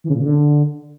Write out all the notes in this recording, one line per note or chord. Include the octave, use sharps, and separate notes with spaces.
E3
C#3
A#2
C#3
D3